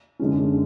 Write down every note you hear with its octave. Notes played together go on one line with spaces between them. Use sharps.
F#2 D3 G#3 C#4